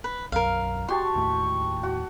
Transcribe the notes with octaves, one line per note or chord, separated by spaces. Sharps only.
B4
B1 F#2 A#4 F5
F#4 G4 A5 C6 C#6
D#2 A2
F#4